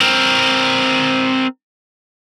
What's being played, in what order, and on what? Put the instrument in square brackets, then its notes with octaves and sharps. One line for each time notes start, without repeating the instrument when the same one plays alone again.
[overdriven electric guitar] C4 A#4